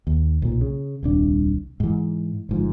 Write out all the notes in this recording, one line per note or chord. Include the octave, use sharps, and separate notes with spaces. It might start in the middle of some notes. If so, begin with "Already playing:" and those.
D#2
B1 A#2
C#3
D#1 C2 D4
G#2 E3
G1 G#2 F3